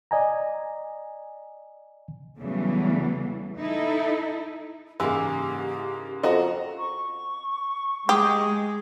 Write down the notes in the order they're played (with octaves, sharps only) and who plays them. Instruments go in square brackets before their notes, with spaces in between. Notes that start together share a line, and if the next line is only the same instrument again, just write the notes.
[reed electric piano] D5 D#5 G#5 A#5
[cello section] E2 C#3 E3 F#3 G3 A3
D#4 E4 A4
[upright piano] G#2 C#3 A#3 [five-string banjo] E3 [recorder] G4
[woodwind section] F2 [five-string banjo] F#4 D#5 [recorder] A#5
[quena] C#6
[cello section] G#3 [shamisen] G4 [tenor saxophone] G#4